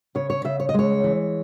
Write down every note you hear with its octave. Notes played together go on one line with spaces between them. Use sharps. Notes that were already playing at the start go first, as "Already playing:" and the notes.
C#3 C#5
C#5
C#3 E5
C#5
D#5
G#3 C#5
E3